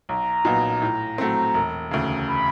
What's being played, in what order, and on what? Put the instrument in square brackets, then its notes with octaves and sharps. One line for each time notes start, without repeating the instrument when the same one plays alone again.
[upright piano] B1 [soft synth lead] A#5
[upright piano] A#2 F#3 B3 D#4
A2
F#3 A3 C4
E1
D2 C#3
[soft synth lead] B5